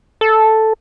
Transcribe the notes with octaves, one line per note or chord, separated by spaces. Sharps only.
A4